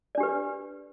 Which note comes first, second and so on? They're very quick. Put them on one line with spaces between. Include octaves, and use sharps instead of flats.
D5 D4 G4 B4